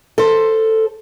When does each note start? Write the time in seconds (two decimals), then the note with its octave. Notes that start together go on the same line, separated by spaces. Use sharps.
0.18 A4 C5